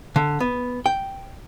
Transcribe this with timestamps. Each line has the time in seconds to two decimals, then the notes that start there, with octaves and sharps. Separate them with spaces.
0.16 D3
0.40 B3
0.86 G5